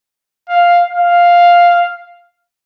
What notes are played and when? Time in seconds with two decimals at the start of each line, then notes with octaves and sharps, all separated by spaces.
0.49 F5
0.90 F5